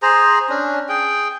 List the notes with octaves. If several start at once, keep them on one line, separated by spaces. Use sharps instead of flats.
G#4 C5 A#5
C#4 D4
G#4 G5